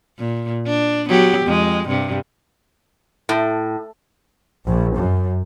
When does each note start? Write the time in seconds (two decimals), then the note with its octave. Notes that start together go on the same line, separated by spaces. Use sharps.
0.18 A#2
0.66 D4
1.08 F#3 B3 G4
1.46 F2 G#3
1.87 G2 C3
3.29 A2
4.67 A#1
4.97 F#2